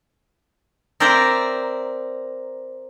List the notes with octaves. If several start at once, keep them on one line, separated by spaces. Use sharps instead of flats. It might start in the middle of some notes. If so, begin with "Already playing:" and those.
C4 A#4 C5 D5 E5 A#5